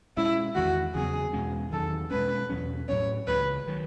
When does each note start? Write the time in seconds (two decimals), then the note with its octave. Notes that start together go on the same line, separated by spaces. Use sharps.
0.17 B2 G#3 C#4 E4
0.55 E2 D#3 G#3 F#4
0.95 E2 C#3 F#3 B3 G#4
1.33 E2 B2 G#3 C#4
1.72 E2 D#3 F#3 A4
2.11 B2 G#3 C#4 B4
2.50 E2 B2 F#3 C#4
2.89 A2 F#3 C#4 C#5
3.27 C#2 C#3 E3 B4
3.67 D#3 F#3